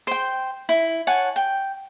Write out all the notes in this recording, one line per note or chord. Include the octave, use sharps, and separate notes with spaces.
C5 G5
E4
C#5 F#5 G#5 A5
G5